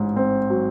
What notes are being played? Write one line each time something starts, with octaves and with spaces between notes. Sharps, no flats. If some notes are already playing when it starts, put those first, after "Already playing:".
Already playing: A1 G#2
C4
F#3